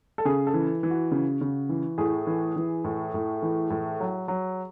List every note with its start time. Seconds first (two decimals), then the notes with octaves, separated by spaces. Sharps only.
0.18 A4
0.25 C#3 G#4
0.47 A4
0.54 E3
0.83 E3
0.90 F#4
1.11 C#3
1.41 C#3
1.69 E3
1.98 A2 G#4
2.27 E3
2.56 E3
2.84 A2
3.14 A2
3.42 E3
3.70 A2
4.00 F#3
4.28 F#3